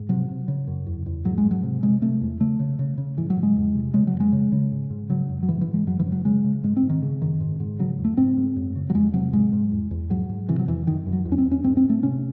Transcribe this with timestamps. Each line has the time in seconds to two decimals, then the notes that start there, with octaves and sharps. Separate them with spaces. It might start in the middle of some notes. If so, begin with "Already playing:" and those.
Already playing: G#2
0.09 C3 F#3
0.29 C3
0.48 C#3
0.67 F#2
0.87 E2
1.06 E2
1.25 G#2 F#3
1.38 G#3
1.44 G#2
1.51 F#3
1.63 C3
1.83 C3 G#3
2.02 C3 A3
2.21 E2
2.40 C#3 A3
2.59 C#3
2.79 C#3
2.98 C#3
3.17 G#2 E3
3.30 F#3
3.36 G#2
3.43 G#3
3.56 E2
3.75 C3
3.94 C#3 G#3
4.07 F#3
4.14 F#2
4.20 G#3
4.32 C#3
4.52 C#3
4.72 G#2
4.90 G#2
5.10 C#3 F#3
5.29 F#2
5.43 F#3
5.48 G#2 E3
5.61 E3
5.67 G#2
5.74 G#3
5.87 F#2 F#3
5.99 E3
6.06 C#3
6.12 F#3
6.25 C#3 G#3
6.44 C#3
6.64 G#2 G#3
6.77 C4
6.83 G#2
6.89 D#3
7.02 C#3
7.21 F#2 D#3
7.40 G#2
7.60 G#2
7.79 C#3 F#3
7.99 E2
8.05 A3
8.17 G#2 C4
8.37 G#2
8.56 F#2
8.76 C#3
8.90 F#3
8.94 E2 G#3
9.14 C3 F#3
9.33 G#2 G#3
9.53 G#2
9.71 E2
9.91 E2
10.10 G#2 F#3
10.29 G#2
10.48 C3 E3
10.59 F#3
10.68 E2 E3
10.87 F#2 D#3
11.07 F#2
11.13 F#3
11.25 E2
11.32 C#4
11.38 C4
11.45 E2
11.51 C#4
11.64 G#2 C4
11.77 C4
11.84 G#2
11.89 A3
12.03 C3 C#4